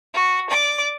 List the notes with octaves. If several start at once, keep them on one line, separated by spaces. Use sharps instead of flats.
F#4
D5 D6